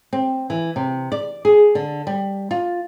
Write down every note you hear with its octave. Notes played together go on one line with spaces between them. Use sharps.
C4
E3
C3
D5
G#4
D3
G3
F4